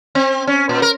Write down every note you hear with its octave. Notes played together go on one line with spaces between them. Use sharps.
C4
C#4
A#2
A#4